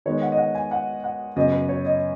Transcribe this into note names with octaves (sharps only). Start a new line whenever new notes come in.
D#3 G#3 B3 D#4 C#5
F#5
D#5
F#5
G#5
F#5
F#5
F#2 C#3 B3 D#5
B4
C#5
D#5